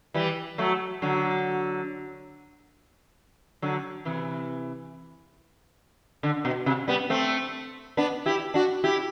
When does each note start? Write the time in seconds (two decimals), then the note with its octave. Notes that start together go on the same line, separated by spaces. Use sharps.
0.14 E3 G3
0.58 F#3 A3
1.02 D3 F#3
3.62 D3 F#3
4.05 C3 E3
6.23 D3
6.45 B2
6.66 C3
6.88 G3 B3
7.10 A3 C4
7.97 B3 D4
8.26 E4 G4
8.54 D4 F#4
8.84 E4 G4